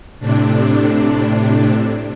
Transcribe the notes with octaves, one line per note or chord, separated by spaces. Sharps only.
A2 C3 D4